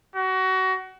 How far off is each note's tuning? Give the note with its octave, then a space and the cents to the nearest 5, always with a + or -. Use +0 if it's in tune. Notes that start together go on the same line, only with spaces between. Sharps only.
F#4 +25